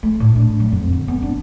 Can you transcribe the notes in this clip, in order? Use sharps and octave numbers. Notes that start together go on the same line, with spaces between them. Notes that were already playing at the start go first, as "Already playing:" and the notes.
A3
A2
D4
F#3
F2
D3
B3
D4